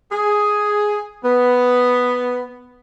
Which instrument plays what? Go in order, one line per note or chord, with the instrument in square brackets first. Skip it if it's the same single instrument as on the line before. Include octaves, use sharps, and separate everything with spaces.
[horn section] G#4
B3